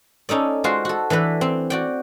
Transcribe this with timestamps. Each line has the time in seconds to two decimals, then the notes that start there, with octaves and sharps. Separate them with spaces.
0.29 C#4 D#4 A4 D5
0.64 G#3 F4 F#4 C5
0.85 F#4 A4
1.10 E3 D4 A4 B4
1.41 C4
1.70 F#4 D5 G5